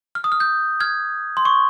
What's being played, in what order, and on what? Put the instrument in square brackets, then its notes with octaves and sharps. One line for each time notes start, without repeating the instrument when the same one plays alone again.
[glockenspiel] F6
D#6
F6
G6
F6 G#6
C6
C#6